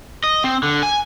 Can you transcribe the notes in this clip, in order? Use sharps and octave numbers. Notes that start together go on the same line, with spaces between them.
D#5
C4
D3
G#5